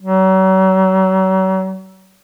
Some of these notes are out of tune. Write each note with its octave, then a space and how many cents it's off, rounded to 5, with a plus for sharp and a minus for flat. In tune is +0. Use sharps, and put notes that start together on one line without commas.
F#3 +40